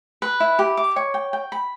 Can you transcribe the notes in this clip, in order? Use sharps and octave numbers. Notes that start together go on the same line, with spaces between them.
B4
E4
G4
D6
C#5
G5
G5
B5